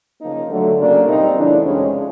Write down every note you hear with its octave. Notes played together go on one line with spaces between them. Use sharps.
C#3 F3 A#3 D#4
D3 F#3 A3
C#3 F#3 A#3 D4
A#2 G3 C4 D#4
C#3 E3 A3 D4
F2 C3 F3 G#3 C#4